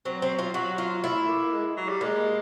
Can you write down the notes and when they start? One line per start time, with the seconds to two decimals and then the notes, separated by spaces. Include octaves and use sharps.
0.05 F#3 C4
0.22 C4
0.39 F4
0.54 F#3 F#4
0.78 F4
1.03 A3 E4
1.27 A#3
1.52 G#3
1.77 F#3
1.89 G3
2.01 G#3 A#3